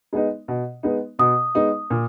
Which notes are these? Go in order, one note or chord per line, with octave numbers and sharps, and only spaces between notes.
G#3 B3 D#4
B2
G#3 B3 D#4
B2 D#6
G#3 B3 D#4
A#2